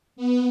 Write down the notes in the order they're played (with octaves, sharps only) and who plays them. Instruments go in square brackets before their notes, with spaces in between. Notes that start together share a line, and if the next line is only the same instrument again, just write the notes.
[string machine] B3